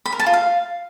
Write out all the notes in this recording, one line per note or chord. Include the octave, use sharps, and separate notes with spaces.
B5
A#4
A5
F4
F5